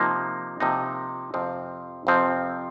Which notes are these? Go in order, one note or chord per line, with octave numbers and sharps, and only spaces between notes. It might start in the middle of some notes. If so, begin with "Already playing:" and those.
Already playing: C3 F3 A#3 D#4
C3 F3 A#3 D#4
F2 C3 F3 C4
F2 C3 F3 C4